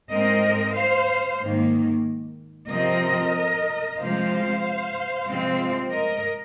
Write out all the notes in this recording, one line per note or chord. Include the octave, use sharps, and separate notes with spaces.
G#2 G#3 C4 A#4 D#5
C5 F5
G#2 D#3 A#3
C3 F3 C4 A#4 D#5
C3 F3 G#3 C4 C5 F5
C3 F3 G#3 C4
A#4 D#5